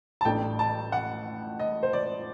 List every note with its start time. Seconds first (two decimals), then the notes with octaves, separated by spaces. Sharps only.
0.21 A5
0.25 A1 A2 A3 D4 G5
0.59 A5
0.92 F#5
1.60 D#5
1.83 C5
1.93 D5